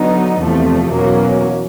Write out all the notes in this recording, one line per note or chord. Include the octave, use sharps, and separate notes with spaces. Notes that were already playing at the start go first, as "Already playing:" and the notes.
Already playing: D3 F#3 B3 D#4
E2 C3 F3 A3
E2 B2 F#3 A#3 C#4